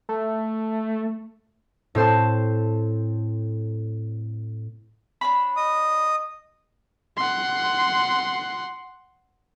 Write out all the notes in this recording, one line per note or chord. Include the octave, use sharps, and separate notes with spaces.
A3
A2 C4 C5 A5
D4 C#5 B5
D#5 D#6
F#5 C6